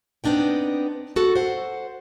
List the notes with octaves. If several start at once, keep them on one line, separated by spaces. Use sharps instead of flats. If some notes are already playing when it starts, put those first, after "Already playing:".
B3 C4 D4 D#4 G5
F#4 A4
C5 F#5